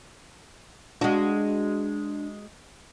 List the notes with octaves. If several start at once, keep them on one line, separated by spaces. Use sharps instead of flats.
G#3 D4 F#4